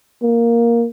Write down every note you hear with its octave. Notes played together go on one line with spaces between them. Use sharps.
A#3